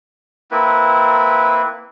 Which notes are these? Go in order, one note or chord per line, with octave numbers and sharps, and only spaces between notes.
A#3 C4 E4 B4